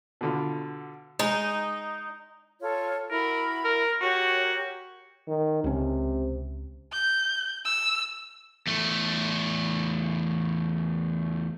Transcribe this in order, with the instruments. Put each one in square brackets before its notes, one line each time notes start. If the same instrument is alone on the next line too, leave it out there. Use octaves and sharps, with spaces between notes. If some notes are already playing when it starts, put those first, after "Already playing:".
[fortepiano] B2 D3 F4
[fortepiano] G#3 [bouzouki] D#4
[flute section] F4 A4 C#5
[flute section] E4 F#4 B5 [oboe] A#4
[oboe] A#4
[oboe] F#4 [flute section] G4 A#4 C#5
[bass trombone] D#3
[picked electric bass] C#2 C#4 [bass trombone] C3
[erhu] G6
E6
[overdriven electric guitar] E2 A3